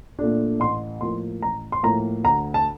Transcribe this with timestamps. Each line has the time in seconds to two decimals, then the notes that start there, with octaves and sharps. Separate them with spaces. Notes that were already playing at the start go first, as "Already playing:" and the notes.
0.19 A#2 A3 D4
0.60 A1 C6
1.01 A2 F3 A#3 C6
1.42 A1 A#5
1.72 C6
1.83 A2 F3 A#3 A#5
2.24 D2 A#5
2.54 A5